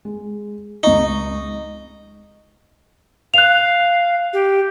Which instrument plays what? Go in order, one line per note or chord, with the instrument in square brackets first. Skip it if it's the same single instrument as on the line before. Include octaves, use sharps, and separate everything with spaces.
[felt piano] G#3
[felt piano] C#2 C#6 [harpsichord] D#4
[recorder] F5 [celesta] F#6 F7
[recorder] G4